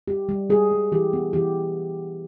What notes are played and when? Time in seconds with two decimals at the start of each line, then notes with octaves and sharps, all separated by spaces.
0.08 G3 G4
0.29 G3
0.50 G3 G#4
0.71 G3
0.92 E3 G4
1.13 B3
1.33 E3 G4